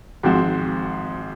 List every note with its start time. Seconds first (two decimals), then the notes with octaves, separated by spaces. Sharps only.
0.23 G#1 G#2 F3 C4 F#4